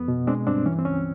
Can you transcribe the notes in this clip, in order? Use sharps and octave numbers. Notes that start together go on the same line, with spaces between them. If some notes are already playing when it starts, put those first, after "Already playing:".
Already playing: F2 B3
B2
G#3 C4 D4
G2 C4 D4
E3 C#4
C4
C#2 C#4